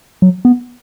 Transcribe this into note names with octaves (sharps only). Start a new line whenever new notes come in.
F#3
B3